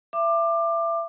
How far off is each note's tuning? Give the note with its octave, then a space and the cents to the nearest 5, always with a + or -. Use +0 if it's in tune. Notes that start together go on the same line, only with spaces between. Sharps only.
E5 +25 D6 +20